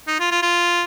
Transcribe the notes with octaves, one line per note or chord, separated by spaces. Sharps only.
D#4
F4
F4
F4